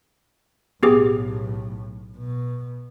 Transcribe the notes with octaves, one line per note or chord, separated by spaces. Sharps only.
B1 A2 B3 G4 G#4
B2